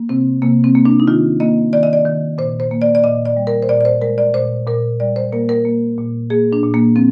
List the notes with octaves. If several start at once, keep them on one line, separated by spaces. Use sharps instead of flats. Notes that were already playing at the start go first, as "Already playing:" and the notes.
Already playing: A#3
C3 C4
C3 A#3
C4
A#3
D4
D#4
D#3 F4
A#3 D#5
D#3 D5
D#5
D5
D#3
A#2 C5
C5
A#3
D5
D5
A#2 D#5
D5
G3
A#4
C5
A#2 D5
D5
C5
G#3 A#4
D5
A#2 C5
A#2 A#4
G3 D5
C5
A#3 A#4
A#4
A#3
A#2
A#3 G#4
D4
A#2
A#3
F3 C4